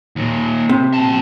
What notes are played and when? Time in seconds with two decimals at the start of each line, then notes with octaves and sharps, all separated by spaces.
0.16 D#2 A#2
0.69 C3
0.94 A#2 A5